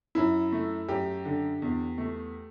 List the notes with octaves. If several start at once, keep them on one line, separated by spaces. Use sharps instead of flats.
F#2 E4
A3
F#2 G4
D3
E2
A3